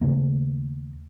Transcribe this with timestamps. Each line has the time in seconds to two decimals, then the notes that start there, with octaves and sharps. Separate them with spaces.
0.01 D#2 C#3 A3 A#3